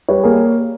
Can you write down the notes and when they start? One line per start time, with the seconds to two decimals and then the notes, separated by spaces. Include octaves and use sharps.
0.08 G3 B4 C#5
0.24 A#3 G#4